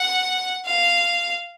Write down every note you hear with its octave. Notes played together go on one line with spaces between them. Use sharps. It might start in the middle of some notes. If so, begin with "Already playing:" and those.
Already playing: F#5
F5